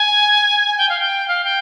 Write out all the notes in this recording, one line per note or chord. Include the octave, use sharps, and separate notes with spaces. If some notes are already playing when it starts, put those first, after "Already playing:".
Already playing: G#5
G5
F5
G5
F5
G5